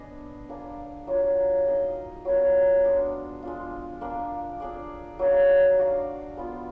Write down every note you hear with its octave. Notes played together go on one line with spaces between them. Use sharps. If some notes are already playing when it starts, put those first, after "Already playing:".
Already playing: B3 D4 G#4 B4 D#5
A#3 D4 G#4
F#3 A#3 F4
A#3 D#4 G#4 D#5
F#3 B3 F4 A#4
G#3 D4 G#4
G#3 D4 F4
A#3 D4 G#4
D4 G#4 D5
F#3 A#3 D#4 G#4
D4 F#4 D5 F5
G#3 B3 F4